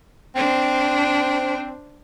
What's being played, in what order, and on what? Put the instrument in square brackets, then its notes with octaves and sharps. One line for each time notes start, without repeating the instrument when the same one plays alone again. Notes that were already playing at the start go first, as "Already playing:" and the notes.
[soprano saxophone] C4 [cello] D4 C5